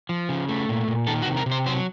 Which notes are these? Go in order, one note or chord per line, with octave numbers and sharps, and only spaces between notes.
F3
C#3
A3
A#2
A#2
D#3 A4
F#4
C3
A#4
C3
C5
F#3 C5